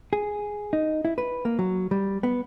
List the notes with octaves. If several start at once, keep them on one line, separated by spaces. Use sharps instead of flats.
G#4
D#4
E4
B4
A#3
F#3
G3
B3